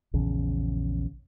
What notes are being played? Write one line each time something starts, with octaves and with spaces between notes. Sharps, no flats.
A#1 E2 C#3